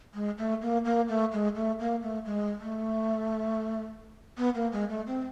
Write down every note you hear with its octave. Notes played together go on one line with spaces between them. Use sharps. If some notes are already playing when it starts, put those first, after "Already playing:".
G#3
A3
A#3
A#3
A3
G#3
A3
A#3
A3
G#3
A3
B3
A#3
G#3
A3
C4